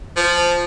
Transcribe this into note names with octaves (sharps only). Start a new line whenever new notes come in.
F3